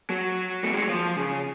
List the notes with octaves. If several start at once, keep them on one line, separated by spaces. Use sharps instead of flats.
F#3
A3
G#3
F#3
F3
C#3